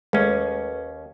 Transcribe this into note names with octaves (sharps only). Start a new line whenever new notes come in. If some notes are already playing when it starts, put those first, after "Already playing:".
D#2 G#3 A3 C#4 A4 B4